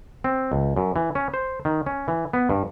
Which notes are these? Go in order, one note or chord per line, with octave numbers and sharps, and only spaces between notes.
C4
C#2
F#2
E3
C#4
C5
D#3
C#4
E3
B3
G2